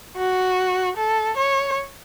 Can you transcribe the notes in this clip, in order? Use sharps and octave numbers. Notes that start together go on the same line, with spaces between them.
F#4
A4
C#5